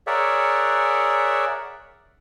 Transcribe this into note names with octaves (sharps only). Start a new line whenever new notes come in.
G#4 A#4 C#5 D5 E5 F#5